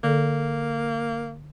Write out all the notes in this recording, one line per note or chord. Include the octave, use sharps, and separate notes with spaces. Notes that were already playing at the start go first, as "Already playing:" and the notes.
D3 A#3 A4